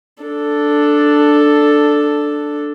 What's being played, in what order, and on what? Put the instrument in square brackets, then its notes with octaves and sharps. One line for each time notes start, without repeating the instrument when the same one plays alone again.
[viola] D4 A4